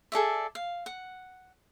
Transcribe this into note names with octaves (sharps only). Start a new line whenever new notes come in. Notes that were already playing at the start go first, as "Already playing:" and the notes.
G#4 A4 D5 E5
F5
F#5